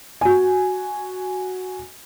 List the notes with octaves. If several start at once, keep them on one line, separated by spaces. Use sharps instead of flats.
F#4 G#5